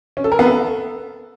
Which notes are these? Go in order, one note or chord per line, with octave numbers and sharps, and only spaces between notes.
C#4
A4
A#4
B3
A4